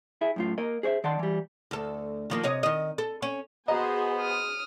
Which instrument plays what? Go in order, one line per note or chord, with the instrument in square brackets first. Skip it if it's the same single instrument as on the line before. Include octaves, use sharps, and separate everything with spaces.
[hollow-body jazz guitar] E4 G#4 E5
F#2 A2 F4
A#3 A#4 D#5
G#4 C5 C#5 E5
D#3 D5 F#5 A5 C6
E3 G3
[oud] D2 A4
D#3 F3 A#3
C3 C#5 D#5
D#3 D#5
A4
C#4
[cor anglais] B3 [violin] F#4 [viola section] G#4 C5 [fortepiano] D#5 A#5
[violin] D#6 F6